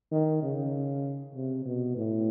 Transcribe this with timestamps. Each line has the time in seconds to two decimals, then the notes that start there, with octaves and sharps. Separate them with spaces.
0.11 D#3
0.43 C#3
1.35 C3
1.65 B2
1.96 A2